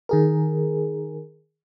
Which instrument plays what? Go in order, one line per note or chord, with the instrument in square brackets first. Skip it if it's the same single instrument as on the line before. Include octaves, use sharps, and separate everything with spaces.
[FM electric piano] D#3 G#4 A#4